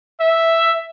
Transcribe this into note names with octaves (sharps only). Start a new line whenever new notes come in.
E5